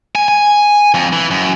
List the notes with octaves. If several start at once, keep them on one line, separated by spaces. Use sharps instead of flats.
G#5
G#5
F2
E3
F#2